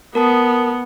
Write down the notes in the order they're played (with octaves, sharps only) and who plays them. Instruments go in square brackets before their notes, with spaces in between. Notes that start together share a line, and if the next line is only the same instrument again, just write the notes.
[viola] B3 [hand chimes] A#4 A5 D#6